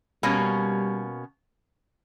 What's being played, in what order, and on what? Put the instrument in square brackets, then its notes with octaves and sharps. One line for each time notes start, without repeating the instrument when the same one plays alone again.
[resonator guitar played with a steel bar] B2 A#3 C#4 [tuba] G3